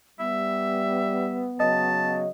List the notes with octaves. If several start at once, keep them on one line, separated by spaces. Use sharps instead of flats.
G3 B3 E5
C#3 F#3 D#5 A5